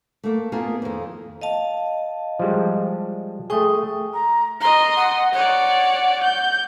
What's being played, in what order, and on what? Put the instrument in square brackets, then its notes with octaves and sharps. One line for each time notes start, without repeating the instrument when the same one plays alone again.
[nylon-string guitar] A3 A#3
A#3 B3 F4 G#4
F2 D#3
[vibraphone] D#5 F5 A5
[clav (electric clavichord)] F3 G3 G#3
[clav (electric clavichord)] A3 G#4 [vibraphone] G5 C#6 D#6
[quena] A#5
[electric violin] D#5 C6 [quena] A#5
[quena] F#5
[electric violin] C#5 D5 [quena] F#5
[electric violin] G6